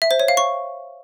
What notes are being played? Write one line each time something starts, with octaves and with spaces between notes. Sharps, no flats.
E5
C5
C#5
F5
C#6